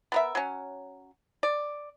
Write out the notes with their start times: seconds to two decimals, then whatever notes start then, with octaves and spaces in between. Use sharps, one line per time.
0.12 B3 A#4 E5
0.35 F#3 C#4
1.43 D5